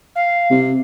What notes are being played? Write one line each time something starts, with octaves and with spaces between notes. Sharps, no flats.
F5
C3